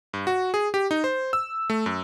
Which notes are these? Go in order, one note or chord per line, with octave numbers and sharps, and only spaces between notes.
G2
F#4
G#4
G4
D#4
C5
E6
A3
F#2